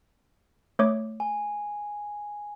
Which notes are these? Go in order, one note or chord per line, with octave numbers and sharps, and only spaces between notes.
A3 C#5 D6
G#5